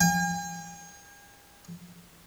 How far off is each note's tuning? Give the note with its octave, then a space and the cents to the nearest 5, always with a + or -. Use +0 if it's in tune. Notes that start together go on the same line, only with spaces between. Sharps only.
G#5 -45